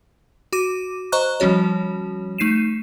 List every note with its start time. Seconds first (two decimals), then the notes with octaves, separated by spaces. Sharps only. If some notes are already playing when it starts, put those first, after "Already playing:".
0.53 F#4 D6 D#7
1.12 C5 D#5 A#5 C#6 F#6
1.40 F3 G3 C#4 F#4 C#5
2.38 A3 D#4 C7 D#7 E7